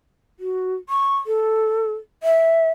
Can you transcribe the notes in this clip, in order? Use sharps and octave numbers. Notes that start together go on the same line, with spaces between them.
F#4
C#6
A4
E5